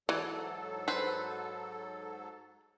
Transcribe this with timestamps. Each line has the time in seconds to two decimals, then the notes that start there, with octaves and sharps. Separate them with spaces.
0.09 G#2 E3 F#3 A4
0.88 B4 C5